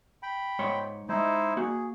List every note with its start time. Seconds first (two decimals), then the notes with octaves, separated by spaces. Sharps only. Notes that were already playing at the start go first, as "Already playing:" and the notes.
0.23 G5 B5
0.59 G#2 C#5 C6
1.09 G#3 D#4 E4 C5
1.57 A#3 F#4 G#4